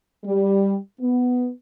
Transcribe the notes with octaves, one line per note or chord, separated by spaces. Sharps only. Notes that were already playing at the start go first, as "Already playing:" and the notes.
G3
B3